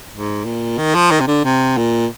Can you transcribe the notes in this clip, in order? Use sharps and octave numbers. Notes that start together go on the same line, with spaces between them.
G#2
A#2
D#3
F3
D#3
C3
D3
C3
A#2